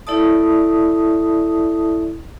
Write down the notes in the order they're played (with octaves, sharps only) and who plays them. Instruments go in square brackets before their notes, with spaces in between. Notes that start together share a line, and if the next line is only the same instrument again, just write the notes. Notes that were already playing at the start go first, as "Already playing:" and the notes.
[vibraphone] E4 A4 D5 E5 A5 D#6